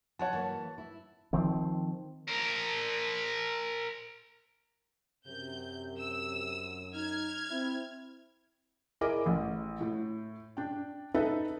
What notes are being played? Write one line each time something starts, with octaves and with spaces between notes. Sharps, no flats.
F#3 C#5 F#5 A5
E3 A#3 F#4 A5
E4
D#3 F3 C4
A#4 C5
F#2 C3 G6
E6
D#4 F6 G#6
C4 E4
E4 G#4 A#4 D#5 D6
A1
A2
D4 G5
D#4 A4 B4 D#5 E5